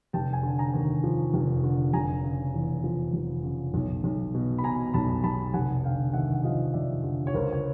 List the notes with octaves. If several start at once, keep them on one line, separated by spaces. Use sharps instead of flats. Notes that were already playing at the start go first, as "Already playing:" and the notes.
F1 G5 A5
G#5
D3 A5
G#5 A#5
D#2
F3
F1
D3
F1 G#5 A#5
C#3
E2
F3
F1
C#3
B1
B1
B2
B5
B2 G#5 A#5
B1 A5 B5
B1 A5 B5
F1 F#5 G#5
D3 F5 G5
D#2 E5 F#5
F#5
F3 D#5 F5
F1 D5 E5
D3
C#5
C#2 A#4 C5
C#5